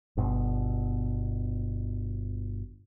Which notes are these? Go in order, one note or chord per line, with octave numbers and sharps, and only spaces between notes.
G1 B2